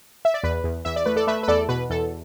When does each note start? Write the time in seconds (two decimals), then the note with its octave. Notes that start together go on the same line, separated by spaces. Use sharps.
0.25 E5
0.34 D5
0.43 E2 B4
0.64 E2
0.85 E2 E5
0.96 D5
1.06 A3 B4
1.16 A4 D5
1.27 A3 B4 E5
1.43 B4
1.48 E2 A4 D5
1.69 B2 B4
1.90 E2 A4